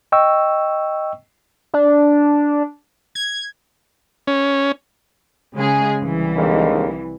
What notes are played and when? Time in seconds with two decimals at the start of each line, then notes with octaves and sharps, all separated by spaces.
0.12 D#5 G5 C#6 E6
1.74 D4
3.15 G#6
4.27 C#4
5.55 C#3 G#3 G#4
6.00 C2 E3
6.36 D#2 D3 G#3